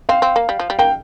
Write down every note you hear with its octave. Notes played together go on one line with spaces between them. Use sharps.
C4 F5
C4
A#3
G3
F3
G3
A#3 G5